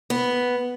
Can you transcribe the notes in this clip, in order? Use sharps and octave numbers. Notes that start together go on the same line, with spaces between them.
B3